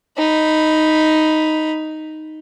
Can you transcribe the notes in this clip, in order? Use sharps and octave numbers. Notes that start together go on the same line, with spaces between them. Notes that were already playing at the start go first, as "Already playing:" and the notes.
D#4 B5